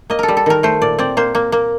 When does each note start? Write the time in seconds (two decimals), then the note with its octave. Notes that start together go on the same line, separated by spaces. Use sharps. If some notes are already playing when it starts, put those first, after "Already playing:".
0.10 A#3 D#5
0.19 A4 A#4
0.28 G3
0.37 A4
0.46 D#3 A#4
0.63 A3 C5
0.81 A#2 D5
0.99 C4 D5
1.17 A#3 C5
1.35 A#3
1.52 A#3